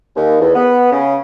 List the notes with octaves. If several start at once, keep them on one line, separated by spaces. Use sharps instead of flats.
D#2
E2
B3
C#3